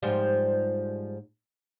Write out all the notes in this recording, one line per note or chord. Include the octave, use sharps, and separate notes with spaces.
G#2 F3 G3